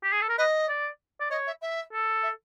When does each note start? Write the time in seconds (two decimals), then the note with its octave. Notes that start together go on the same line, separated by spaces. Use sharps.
0.04 G4
0.13 G#4
0.22 A4
0.29 A#4
0.38 B4 D#5
0.69 D5
1.20 D5
1.30 C#5 D#5
1.47 E5
1.61 E5
1.93 A4
2.23 E5